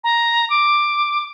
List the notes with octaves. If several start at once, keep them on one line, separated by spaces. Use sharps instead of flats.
A#5
D6